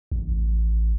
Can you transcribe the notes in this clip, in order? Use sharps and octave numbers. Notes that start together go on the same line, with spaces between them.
A1